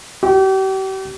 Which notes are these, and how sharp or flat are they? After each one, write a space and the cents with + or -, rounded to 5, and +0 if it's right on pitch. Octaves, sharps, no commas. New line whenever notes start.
G4 -40